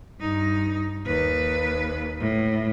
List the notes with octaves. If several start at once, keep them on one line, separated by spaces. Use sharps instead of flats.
G2 D#4
D#2 B4
A2